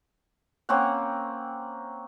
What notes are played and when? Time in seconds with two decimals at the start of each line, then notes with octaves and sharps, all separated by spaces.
0.69 A#3 C4 C#4 F#5